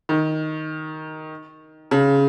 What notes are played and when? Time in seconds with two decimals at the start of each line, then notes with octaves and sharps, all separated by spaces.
0.09 D#3
1.91 C#3